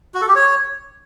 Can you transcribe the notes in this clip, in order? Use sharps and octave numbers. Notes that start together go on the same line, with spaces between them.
F#4
A4
G4
C#5